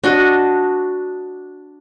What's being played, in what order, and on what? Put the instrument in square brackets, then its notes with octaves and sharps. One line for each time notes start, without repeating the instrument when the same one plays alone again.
[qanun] D4 F#4 D#5